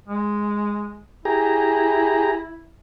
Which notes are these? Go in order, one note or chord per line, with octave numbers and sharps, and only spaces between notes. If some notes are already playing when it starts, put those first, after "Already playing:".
G#3
E4 G4 G#4 A#5